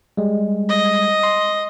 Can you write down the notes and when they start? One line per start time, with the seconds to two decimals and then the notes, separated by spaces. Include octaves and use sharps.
0.17 G3 G#3
0.69 D#5
1.23 C6